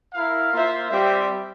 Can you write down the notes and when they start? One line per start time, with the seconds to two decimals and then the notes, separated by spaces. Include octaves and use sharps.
0.14 E4 A#4 F5
0.52 A#3 F4 C5 E5
0.91 G3 C4 G4 C5 E5